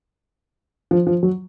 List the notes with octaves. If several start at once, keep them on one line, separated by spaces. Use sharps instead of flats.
F3
F3
F#3